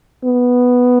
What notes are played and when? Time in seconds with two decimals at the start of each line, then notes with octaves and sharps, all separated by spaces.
0.24 B3